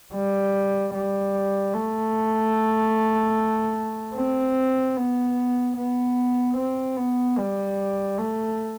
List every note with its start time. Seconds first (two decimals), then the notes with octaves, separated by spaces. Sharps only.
0.14 G3
0.94 G3
1.74 A3
4.15 C4
4.97 B3
5.77 B3
6.57 C4
6.97 B3
7.38 G3
8.18 A3